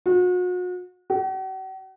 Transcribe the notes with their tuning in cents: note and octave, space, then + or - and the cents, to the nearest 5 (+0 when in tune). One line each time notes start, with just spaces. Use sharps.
F#4 -40
F#4 +45